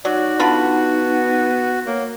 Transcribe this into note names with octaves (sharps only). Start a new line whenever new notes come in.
F#3 D#4 F#4 D5
D3 B3 F4 B5
A#3 C#5